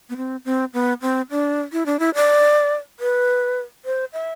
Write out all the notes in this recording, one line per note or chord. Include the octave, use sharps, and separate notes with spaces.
B3
C4
C4
B3
C4
D4
E4
D4
E4
D5
B4
C5
E5